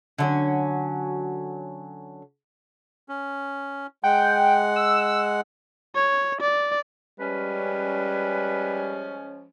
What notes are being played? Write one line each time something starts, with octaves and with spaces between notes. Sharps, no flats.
D3 F#3 C#4
C#4
G#3 F#5 G5
E6
C#5
D5
F3 G3 G#3 C#4 B4